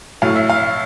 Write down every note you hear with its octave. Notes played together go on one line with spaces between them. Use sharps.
A2 F#3 A3 F5
E5
F5